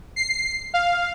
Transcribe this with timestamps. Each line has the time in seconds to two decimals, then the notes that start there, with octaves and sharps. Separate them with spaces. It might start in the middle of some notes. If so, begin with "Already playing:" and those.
0.16 C7
0.74 F5